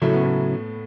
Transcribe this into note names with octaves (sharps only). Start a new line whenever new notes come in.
A2 C#3 F#3 A3 C#4 E4
B3
A2 A3